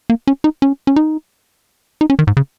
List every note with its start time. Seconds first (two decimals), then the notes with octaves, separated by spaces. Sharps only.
0.10 A#3
0.27 C#4
0.44 D#4
0.62 C#4
0.87 C#4
0.96 D#4
2.01 D#4
2.10 C#4
2.19 D#3
2.27 G#2
2.37 C#3